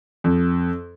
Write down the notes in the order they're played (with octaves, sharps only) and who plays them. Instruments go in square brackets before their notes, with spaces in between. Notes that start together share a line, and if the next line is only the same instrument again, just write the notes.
[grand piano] F2